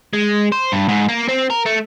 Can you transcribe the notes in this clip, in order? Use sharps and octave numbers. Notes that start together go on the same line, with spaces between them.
G#3
C5
G2
G#2
A#3
C4
A#4
A3